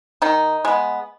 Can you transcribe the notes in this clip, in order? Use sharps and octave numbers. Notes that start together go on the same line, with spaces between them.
D#3 D#4
G#3 B3